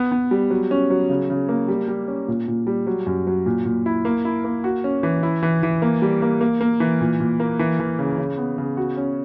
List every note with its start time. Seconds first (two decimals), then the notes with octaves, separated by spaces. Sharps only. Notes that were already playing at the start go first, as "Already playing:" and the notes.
Already playing: B3
0.12 B3
0.31 G3
0.50 F#3
0.71 C#4
0.90 F#3
1.09 C#3
1.30 C#3
1.49 A#3
1.68 G3
1.88 G3
2.08 C#4
2.28 A#2
2.48 A#2
2.67 G3
2.87 F#3
3.07 F#2
3.27 F#3
3.46 A#2
3.65 A#2
3.86 E4
4.05 A#3
4.25 E4
4.44 A#3
4.64 F#4
4.84 C#4
5.03 E3
5.23 E4
5.43 E3
5.63 E3
5.82 A#3
6.02 G3
6.22 A#3
6.41 A#3
6.61 A#3
6.80 E3
7.01 A#2
7.20 A#2
7.40 A#3
7.59 E3
7.80 E3
7.99 C#3
8.18 C#3
8.38 B3
8.58 C#3
8.77 F#4
8.97 C#4